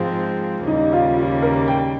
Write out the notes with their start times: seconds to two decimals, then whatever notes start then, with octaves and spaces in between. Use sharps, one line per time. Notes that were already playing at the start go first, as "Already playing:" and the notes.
Already playing: G#2 F3 G#3 C4 F4
0.67 D#2 C#3 G3 A#3 D#4
0.93 F4
1.17 F4
1.42 A#4
1.68 G5